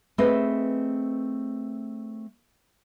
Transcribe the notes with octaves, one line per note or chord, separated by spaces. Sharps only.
A3 C4 G#4 B4 C5 D#5